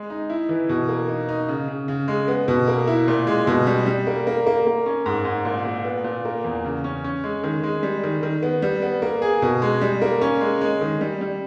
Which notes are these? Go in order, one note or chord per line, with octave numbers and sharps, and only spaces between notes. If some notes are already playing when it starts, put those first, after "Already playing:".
Already playing: G#3
D#4
E4
E3
B2
A#3
D#4
D#4
C#3
C#3
C#3
G#3
B3
B2
A#3
E4
A#2
G#3
B2
G3
G3
A#3
A#3
A#3
A#3
C#4
G#2
G#2
A#2
A#2
B3
A#2
A#3
E2
C#3
C#4
C#4
G#3
D#3
G#3
G3
D#3
D#3
B3
G3
B3
A#3
G#4
B2
G#3
G3
A#3
C#4
G#3
G#3
D#3
G3
G3